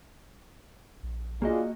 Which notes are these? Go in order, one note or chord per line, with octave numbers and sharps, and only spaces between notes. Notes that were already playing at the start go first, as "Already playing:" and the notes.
A#1
A#3 D4 F4 F#4 G#4 D#5